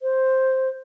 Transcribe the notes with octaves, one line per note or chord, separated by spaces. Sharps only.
C5